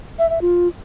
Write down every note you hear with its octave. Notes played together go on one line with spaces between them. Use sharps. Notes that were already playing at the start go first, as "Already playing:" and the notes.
E5
E5
F4